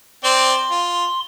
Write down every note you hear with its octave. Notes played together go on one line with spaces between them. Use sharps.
C4 D5 C6
F4